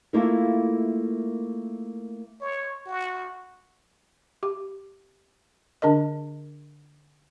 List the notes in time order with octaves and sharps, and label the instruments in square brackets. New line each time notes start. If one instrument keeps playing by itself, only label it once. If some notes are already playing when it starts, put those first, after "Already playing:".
[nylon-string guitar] A3 A#3 E4 F4 A4 A#4
[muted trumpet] C#5
F#4
[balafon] G4
D3 D4 A#4 D#5